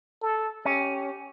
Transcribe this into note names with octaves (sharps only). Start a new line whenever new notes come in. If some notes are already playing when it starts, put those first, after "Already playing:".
A4
C#4 G4